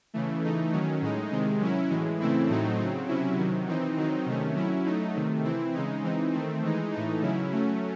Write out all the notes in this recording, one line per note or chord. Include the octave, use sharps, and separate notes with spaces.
C#3 E3 A3
E3 A3 D#4
D#3 F#3 C#4
A2 G#3 D#4
C3 D#3 G#3
F#3 C#4 E4
A2 E3 G#3
C#3 E3 A3 C4 E4
A2 F#3 A3 C4 D#4
C#3 F#3 C4
C3 F#3 C#4 E4
C3 D#3 F#3
E3 C4 D#4
D#3 F#3 C4 D#4
C3 D#3 A3 C#4
F#3 C#4 E4
F#3 A3 D#4
C3 D#3 A3
E3 C4 E4
C#3 G#3 D#4
E3 C4 D#4
D#3 A3 C4
E3 G#3 D#4
A2 E3 A3 D#4
C#3 F#3 C#4 E4
F#3 A3 C#4